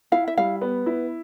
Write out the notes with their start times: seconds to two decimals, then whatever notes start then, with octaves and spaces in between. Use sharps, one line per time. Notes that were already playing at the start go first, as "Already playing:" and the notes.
0.12 E4 F5
0.28 E5
0.37 G3 F5
0.61 B3
0.86 E4